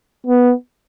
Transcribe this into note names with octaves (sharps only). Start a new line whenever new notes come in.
B3